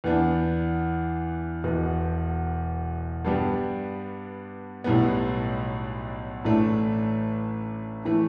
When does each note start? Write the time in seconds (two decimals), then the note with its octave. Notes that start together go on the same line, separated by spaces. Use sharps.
0.04 E2 E3 B3 D4
1.64 E1 E2 B2
3.25 G2 G3 B3 D4 G4
4.84 B1 A2 G3 B3
6.45 A1 A2 A3 D4
8.05 A2 E3 A3